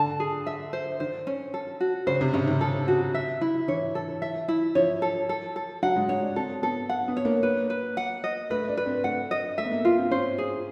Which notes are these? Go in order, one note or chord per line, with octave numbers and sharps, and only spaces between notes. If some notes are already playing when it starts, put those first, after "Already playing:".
Already playing: D3 A5
G#4
E5
C5
D#3 C5
C#4
A4
F#4
C#3 C5
C3
C#3 C#4
D#3
A4
F#4
E5
E4
E3 C#5
A4
E5
E4
F3 C#5
A4
A4
A4
F#3 F#5
G#3
G#3 C#5
D4
C4 A4
B3 A4
F#5
B3
C#5
A#3
B4
B4
F#5
D#5
A3 B4
D4
B4
C4
A3 F#5
D#5
A3 E5
B3
A#3
F4
C4
C#4 C5
G#4